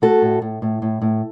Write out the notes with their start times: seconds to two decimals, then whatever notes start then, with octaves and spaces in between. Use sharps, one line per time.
0.02 A3 F#4 A4
0.22 A2
0.42 A2
0.62 A2
0.82 A2
1.02 A2